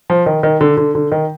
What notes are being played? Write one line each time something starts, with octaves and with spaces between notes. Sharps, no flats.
F3
D#3
D#3
D3
D3
D3
D#3